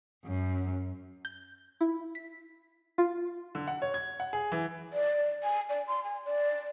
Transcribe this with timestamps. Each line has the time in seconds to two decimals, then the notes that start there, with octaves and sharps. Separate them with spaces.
0.24 F#2
1.25 G6
1.81 E4
2.15 B6
2.98 F4
3.55 D3
3.67 F#5
3.82 C#5
3.94 G#6
4.20 F#5
4.33 G#4
4.52 E3
4.93 D5
5.44 G#5
5.69 D5
5.87 C6
6.04 G#5
6.25 D5